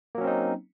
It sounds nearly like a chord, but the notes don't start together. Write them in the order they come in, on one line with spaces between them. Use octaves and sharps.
A#3 F#3 C#4 C4 D#4